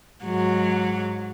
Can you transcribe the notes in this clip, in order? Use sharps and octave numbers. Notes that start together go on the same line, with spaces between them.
G#2 F#3